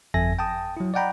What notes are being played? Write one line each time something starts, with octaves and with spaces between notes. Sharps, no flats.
G1 F2 A4 E5 G#5 A#6
G5 A5 D#6
F#3 E4
D5 D#5 F#5 G5 A#5 B5